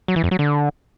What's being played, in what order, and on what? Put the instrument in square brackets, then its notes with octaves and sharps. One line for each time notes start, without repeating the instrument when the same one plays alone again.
[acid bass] F#3
E3
F2
F#3
D3